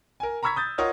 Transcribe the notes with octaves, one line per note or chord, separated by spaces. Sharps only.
A#4 G#5
A#5 B5 C#6 E6 G#6 B6
D#6 G6 A6
F4 A#4 C#5 D#5 F#5 D#6